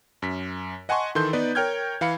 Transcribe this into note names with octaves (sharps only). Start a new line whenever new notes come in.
F#2 B6
D#5 F#5 G#5 A5 C6 C#6
D#3 E3 A4 C6 G6
B3 D#4 B4 D5
A#4 C#5 G5 F6 G6 G#6
E3 F5 B5 C#7